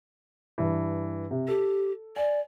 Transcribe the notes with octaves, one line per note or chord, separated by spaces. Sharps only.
G2 E3
C3
G4 A4
D5 G#5